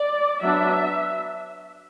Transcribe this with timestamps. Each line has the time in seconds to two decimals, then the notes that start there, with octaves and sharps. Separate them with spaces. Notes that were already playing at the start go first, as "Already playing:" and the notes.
Already playing: D5
0.42 F#3 B3 D4 E5